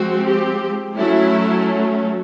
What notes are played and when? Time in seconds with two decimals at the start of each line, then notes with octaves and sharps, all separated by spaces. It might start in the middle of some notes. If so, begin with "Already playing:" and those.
Already playing: F3 G#3 C4 F#4
0.28 G4
0.96 F#3 A3 C#4 E4